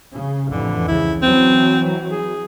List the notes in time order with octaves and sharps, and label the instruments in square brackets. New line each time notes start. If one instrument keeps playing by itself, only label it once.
[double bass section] C#3
[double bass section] A1 F2 E3 [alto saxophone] D3
[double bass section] C#2 C#3 [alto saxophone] E4
[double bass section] E3 F#3 [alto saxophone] C4
[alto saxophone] G#4